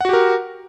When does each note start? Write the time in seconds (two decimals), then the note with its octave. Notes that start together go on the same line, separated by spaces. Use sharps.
0.01 F#5
0.05 F#4
0.09 G4
0.13 A#4